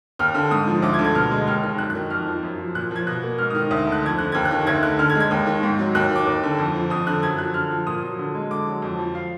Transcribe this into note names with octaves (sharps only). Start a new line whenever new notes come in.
D#2 F6
D3
G#2 D#6
F3
D2 D6
G#6
D3
G#6
B2 F6
G#3
D#2 F6
D#3 F6
F#2 F#6
F#6
D#3
F2 F6
F3
F#2
F3
A#2 F#6
F3 G#6
B2 F#6
A#3
G#2 F6
D#6
D#3 F6
D2 D#6
D3
F#6
F2 G#6
D3 F#6
D#2 G#6
F#6
D#3
D2 G#6
D3 F#6
D3 F6
G#6
G#3
G#6
D#2
D#3
G#2
F#3
D#2 F#6
D#3
D6
D#2
D3
F2
F3
F2 D#6
D3 F#6
F#2 G#6
F3 F#6
D3 F6
F3
A#2 D#6
F#3
D3
G#3
D3 D6
F#3
F2
F3
F5